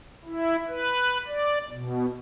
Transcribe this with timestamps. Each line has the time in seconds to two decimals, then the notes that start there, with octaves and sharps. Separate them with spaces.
0.25 E4
0.68 B4
1.27 D5
1.70 B2